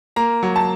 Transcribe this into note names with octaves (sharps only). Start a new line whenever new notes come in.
A#3 A#5
F#3
A5